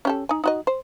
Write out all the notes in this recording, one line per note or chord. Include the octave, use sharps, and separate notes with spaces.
C#4 G4 A4
D#4 G#5
D#4 F#4 D#5
C5